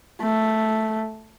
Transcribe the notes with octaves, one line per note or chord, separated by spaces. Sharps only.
A3